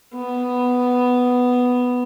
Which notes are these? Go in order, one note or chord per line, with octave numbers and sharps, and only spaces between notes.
B3